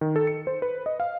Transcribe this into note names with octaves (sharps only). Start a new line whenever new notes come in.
D#3
A4
C#7
C5
B4
D#5
F5